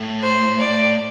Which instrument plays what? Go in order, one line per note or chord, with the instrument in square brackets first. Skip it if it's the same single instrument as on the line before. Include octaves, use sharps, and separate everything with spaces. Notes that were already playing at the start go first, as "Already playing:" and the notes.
Already playing: [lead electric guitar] A2
[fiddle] C5
D5